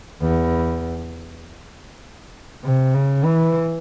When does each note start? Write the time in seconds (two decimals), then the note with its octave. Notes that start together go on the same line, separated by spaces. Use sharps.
0.21 E2
2.64 C3
2.94 C#3
3.24 E3